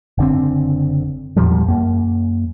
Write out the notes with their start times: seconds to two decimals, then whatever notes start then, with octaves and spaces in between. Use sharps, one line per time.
0.18 F#1 D3 C4
1.36 E2 A#2 F3 G3
1.68 F#2 A#3